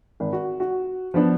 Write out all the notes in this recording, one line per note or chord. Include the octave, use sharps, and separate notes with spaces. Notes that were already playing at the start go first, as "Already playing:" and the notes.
G#1
F#4
F#4
F3 B3 D4